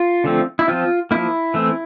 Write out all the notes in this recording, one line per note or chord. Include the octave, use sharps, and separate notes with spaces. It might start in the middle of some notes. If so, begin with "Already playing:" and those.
Already playing: F4
D3 F3 A3 C4
E4
F3 C4 F4
F3 A#3 E4
E3 A3 C4